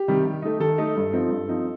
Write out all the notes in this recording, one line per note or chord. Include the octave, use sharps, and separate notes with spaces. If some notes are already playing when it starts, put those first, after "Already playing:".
Already playing: G4
C3 D#3 G3
D#3
A3 D#4
D#3 A4
A3 D#4
G2
F3 C4 D#4
G2
F3 C4 D#4